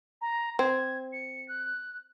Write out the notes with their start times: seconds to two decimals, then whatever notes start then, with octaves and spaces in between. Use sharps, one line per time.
0.21 A#5
0.59 C4 G#6
1.13 C#7
1.48 F#6